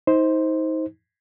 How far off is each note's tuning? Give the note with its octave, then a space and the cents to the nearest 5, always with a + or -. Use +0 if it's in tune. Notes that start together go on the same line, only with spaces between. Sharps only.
D#4 +35 C5 +0